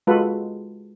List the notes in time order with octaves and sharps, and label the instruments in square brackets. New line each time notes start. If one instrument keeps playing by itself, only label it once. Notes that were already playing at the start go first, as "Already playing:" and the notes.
[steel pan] G#3 F4 F#4 A4 B4